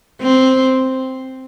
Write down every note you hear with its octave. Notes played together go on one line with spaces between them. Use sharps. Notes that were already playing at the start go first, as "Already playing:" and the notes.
C4